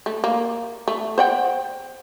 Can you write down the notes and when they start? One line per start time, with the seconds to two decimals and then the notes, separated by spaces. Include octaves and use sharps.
0.06 A3
0.24 A#3
0.88 A3
1.18 C5 F#5 G5